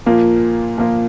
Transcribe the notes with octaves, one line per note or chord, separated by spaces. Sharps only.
A#2 F3 A#3 F4
A#2 F3 A#3 F4